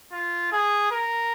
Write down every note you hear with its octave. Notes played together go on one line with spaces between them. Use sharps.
F4
G#4
A#4